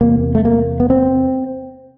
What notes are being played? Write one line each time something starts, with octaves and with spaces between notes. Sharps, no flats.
E2 C3 A#3
A3
A#3
B3
C4